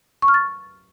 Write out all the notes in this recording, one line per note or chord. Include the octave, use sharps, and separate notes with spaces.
C#6
F6
A6